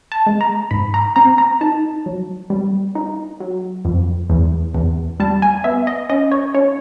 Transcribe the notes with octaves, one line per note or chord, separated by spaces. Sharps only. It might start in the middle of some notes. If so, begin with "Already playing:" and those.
A5
G#3
A#5
G#2 B5
A#5
C4 A#5
A#5
D#4 A5
F#3
G3
D#4
F#3
F2
E2
E2
G3 A5
G#5
B3 E5
D#5
C#4 D#5
C#5
C#4 C#5